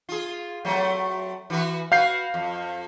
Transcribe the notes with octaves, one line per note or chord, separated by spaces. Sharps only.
F4 G#4
F#3 A3 C4
E3 F#4 B4
F#4 B4 F5 G6 C7
F2